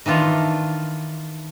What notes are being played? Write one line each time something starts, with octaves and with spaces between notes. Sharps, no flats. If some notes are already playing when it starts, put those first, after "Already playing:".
D#3 E3 D4 F4